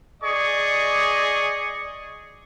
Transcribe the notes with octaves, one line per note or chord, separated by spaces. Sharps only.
G#4 D5 D#5 C#6